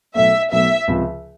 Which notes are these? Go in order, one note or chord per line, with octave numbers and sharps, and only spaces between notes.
B1 B2 F#3 A3 E5
B1 B2 F#3 A3 E5
C#2 C3 F3